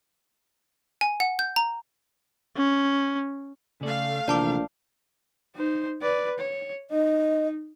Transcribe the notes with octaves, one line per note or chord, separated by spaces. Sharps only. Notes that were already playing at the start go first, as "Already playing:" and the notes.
G#5
F#5
G6
A#5
C#4
C#3 A3 D5 F5
A#1 C3 E3 A#4 D5 A5 D6
D#4 C5
B4 D5
C#5
D#4 D#5